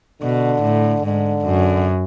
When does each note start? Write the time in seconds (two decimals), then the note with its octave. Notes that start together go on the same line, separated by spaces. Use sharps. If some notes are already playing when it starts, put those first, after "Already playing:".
0.22 B2 D3
0.63 A2
1.04 G#2 D3
1.46 F#2